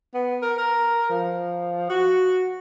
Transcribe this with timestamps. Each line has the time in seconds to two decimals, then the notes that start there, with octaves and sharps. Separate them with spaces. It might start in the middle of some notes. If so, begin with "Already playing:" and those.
0.14 B3
0.42 A#4
0.58 A#4
1.10 F3
1.89 F#4